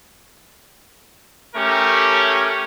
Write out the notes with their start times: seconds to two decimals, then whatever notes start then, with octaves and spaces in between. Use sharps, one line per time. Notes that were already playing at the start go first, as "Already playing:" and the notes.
1.55 A3 C#4 G4 A#4